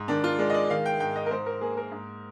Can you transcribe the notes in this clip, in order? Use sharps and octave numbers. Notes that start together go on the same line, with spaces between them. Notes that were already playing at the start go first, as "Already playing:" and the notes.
Already playing: G#2
D#3 D4
F4
G#3 D5
D#5
D5
D#3 F5
G5
G#2 G5
D#5
A#4
G#2 C5
A#4
A#3 G#4
A#4
G#2